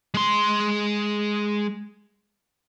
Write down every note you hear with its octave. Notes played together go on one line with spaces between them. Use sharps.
G#3 C6